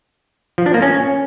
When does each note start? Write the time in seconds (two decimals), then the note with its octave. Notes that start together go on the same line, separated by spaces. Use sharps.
0.58 F3
0.66 D4
0.74 A#3
0.82 C#4